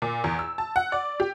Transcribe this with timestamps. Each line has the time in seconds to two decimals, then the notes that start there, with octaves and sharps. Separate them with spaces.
0.02 A#2
0.24 E2
0.39 E6
0.58 A5
0.76 F#5
0.92 D5
1.20 G4